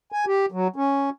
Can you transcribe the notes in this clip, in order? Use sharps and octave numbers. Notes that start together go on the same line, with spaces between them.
G#5
G4
F#3
C#4